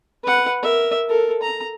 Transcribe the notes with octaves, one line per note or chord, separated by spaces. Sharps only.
B4 F#5
A#4 E5
A4 A#4
A#5